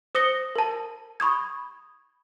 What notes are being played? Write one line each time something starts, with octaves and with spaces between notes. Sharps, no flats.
C5 D#6 A#6 C#7 G7
A#4 A5
B5 C#6 D#6 G#6